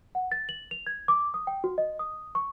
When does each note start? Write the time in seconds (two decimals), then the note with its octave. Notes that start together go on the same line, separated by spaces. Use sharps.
0.15 F#5
0.32 A6
0.49 F#7
0.71 F7
0.87 G#6
1.08 D6
1.34 D#6
1.47 G5
1.64 F#4
1.78 D#5
1.99 D#6
2.35 C#6